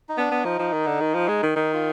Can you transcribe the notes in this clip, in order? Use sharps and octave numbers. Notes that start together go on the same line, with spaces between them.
D#4
B3 D4
B3
F3 D#4
F3
D#3
D3
D#3
F3
G#3
D#3
D#3 D#4
F4